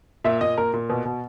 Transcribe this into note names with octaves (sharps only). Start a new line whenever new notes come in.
A#2 E5
A#2 D#5
A#2 A#4
A#2
B2
B2